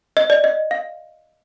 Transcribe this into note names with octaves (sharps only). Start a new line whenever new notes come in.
D#5
D5
D#5
F5